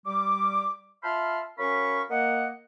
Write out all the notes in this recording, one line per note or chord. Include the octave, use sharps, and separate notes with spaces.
G3 D6
F4 E5 A5 B5 C6 F6
F#3 C#4 A#4 F5 B5 C#6
A#3 D#5 F#5